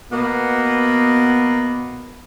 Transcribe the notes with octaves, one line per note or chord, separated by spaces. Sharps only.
B2 A#3 B3